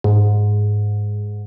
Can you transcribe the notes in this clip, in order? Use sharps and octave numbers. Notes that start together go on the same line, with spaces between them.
G#2